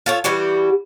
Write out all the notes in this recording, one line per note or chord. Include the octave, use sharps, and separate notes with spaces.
F4 A4 C#5
E3 G3 F#4 G4